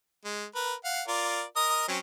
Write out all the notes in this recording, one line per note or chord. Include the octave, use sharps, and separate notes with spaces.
G#3
A#4 B4
F5 F#5
F4 A#4 D5
A#4 D#5 D#6
F#3 C4 C#4